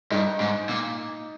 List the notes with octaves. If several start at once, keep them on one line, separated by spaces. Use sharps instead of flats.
G2 D#4
G#2
A#2